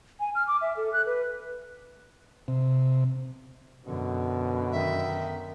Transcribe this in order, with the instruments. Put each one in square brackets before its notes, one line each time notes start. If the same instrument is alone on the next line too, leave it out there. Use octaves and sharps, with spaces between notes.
[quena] G#5
F6
D6
E5
A4
F#6
B4
[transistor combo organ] C3
[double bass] F#2 D3 [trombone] B2
[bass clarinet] D#3 [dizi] E5